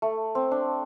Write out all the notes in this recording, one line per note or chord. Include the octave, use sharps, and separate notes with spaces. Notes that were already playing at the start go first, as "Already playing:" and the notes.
A3
C4
D4